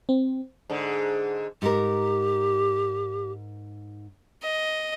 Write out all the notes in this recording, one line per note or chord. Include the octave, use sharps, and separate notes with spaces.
C4
G#2 D3
G#2 G4 A#4
D#5